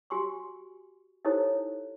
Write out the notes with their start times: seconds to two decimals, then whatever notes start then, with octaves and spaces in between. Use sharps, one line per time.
0.10 F#4 G4 G#5 C6 C#6
1.25 D#4 E4 G4 A4 C5 C#5